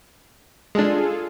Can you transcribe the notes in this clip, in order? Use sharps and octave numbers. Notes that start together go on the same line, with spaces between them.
G#3 D4 F4 G#4 A4